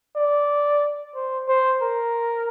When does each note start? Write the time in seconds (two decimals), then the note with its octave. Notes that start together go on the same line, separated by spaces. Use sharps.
0.16 D5
1.15 C5
1.49 C5
1.82 A#4